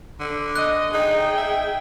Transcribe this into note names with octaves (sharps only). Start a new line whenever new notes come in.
D3
D#5 F#6
D#4 G#4 G5
E5